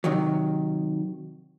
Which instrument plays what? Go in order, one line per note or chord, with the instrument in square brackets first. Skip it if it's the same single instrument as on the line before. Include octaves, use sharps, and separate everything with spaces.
[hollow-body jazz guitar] C3 D#3 F#3